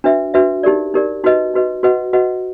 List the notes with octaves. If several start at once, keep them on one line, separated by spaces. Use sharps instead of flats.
D4 F#4 B4 E5
D4 F#4 B4 E5
D#4 G4 A#4 D5
D#4 G4 A#4 D5
D#4 F#4 B4 D#5
D#4 F#4 B4 D#5
F#4 B4 D#5 F#5
F#4 B4 D#5 F#5